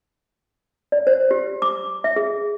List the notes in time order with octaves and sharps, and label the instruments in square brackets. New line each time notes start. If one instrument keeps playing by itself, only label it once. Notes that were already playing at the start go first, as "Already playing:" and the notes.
[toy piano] D5
C5
G4
D6
E5
G#4